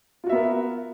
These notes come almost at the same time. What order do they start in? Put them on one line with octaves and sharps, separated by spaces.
F4 F#4 E5 B3 A#4